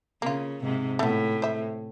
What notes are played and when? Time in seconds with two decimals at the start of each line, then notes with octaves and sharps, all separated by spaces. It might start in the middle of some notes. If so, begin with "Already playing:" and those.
0.22 C#3 A#3 F4
0.63 G#2 C3
0.99 A2 A3 B3
1.42 C5 E5